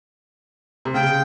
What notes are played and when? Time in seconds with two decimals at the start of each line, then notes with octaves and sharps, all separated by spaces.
0.85 C3
0.94 C#3 G5